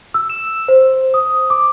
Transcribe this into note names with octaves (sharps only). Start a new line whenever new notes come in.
E6
E7
C5
D#6
D6